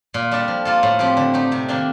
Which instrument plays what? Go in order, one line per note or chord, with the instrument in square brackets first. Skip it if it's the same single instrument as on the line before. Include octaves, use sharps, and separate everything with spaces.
[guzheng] A#2
G3 D4 A4
F3
A#3 F4 A4
A2
F3 C4 G4
D3
A3 D#4 G4
C3
D#3 A#3 D4